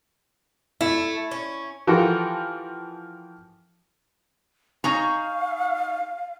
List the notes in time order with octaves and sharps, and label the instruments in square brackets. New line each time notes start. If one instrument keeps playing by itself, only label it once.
[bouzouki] A3 [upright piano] E4
[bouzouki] C#4
[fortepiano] E3 F3 F#4 G4 A4 A#4
[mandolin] D#4 G#4 C#5 [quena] F5 [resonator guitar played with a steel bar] A#5